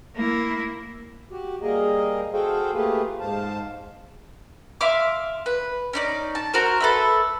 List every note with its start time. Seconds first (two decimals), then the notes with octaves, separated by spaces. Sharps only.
0.16 A#3 E4
1.31 F#4 G4
1.62 G3 A#3 G#4 A#4 D#5
2.33 F#4 G#4 A4 C5 F5 G5
2.74 A3 A#3 F4 G4 G#4 B4
3.20 G#2 C5 F5 A5
4.81 E5 F5 C6 D6
5.46 B4
5.93 C#4 D#4 D5
6.35 A5
6.53 F#4 A#4 C5
6.80 A4 B4 E5